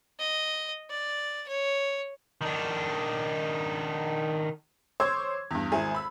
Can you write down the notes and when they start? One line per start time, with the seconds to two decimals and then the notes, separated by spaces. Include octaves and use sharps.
0.19 D#5
0.90 D5
1.48 C#5
2.41 D#3 D4
5.00 C5 C#5 C#6 D6 E6 G#6
5.51 E2 G2
5.72 G#1 E4 G#4
5.95 B5 E6